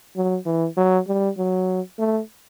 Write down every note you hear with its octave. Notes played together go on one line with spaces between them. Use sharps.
F#3
E3
F#3
G3
F#3
A3